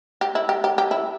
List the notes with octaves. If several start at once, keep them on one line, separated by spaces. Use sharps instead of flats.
G4
E4
G4
G4
G4
E4